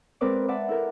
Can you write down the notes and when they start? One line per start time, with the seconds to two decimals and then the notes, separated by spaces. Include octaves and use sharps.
0.21 G#3 C4 A#4 B4 D5 D6
0.48 B4 D5 E5 F#5 A5
0.68 E4 A4 A#4